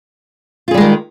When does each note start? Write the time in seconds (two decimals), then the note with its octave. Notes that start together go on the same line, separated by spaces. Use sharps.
0.68 F4
0.71 G#4
0.74 G3
0.78 G#3
0.81 D#3